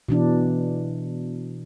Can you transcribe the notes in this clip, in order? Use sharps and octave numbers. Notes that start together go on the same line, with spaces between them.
B2 E3 D4